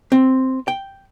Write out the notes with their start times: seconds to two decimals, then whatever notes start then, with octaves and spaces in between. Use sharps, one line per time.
0.12 C4
0.68 G5